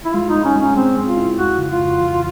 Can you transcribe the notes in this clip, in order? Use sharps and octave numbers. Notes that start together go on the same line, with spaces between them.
E4
G#3 F4
D#4
G#3
C#4
G#3 C#4
G#3 C4
G#3
F4
E4
F2 F#4
C#3
F4
F2
E3